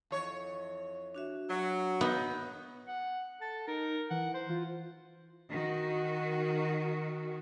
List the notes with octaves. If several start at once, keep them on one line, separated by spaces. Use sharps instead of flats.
F2 E3 C#5
D4 F#4 E5
F#3
B3 D#4
F#5
A4 A6
D#4 A#4
E3 F#5
C5
F4
D#3 F#4